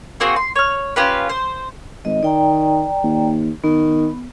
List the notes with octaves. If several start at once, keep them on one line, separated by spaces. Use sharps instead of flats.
A#3 C4 F#4 G#4
C6
C#5 F6
C#4 F4 G4 B4
C5
G#1 D#5
D#3 D5 G5 A#5
D#2
D#3 B3